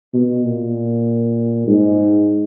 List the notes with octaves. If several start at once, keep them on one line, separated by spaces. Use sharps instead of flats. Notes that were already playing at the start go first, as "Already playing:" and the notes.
B2
A#2
G#2